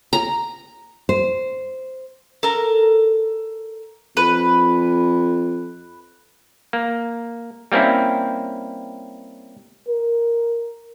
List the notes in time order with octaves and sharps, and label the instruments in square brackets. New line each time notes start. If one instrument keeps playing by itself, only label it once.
[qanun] A#5
[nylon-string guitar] C5
[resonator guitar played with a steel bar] A4 A#4
[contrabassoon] F2 [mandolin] B4
[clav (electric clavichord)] A#3
G3 A#3 C4 C#4 E4
[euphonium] A#4